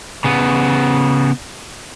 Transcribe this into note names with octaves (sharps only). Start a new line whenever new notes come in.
C#3 B3